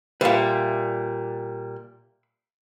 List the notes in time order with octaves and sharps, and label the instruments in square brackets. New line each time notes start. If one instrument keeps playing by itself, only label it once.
[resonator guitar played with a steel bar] A#2 G3 [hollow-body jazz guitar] B4 E5 F5